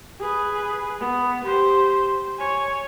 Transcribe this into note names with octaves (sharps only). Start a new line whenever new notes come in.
G#4 B4
B3
G4 C5
C#5 G#5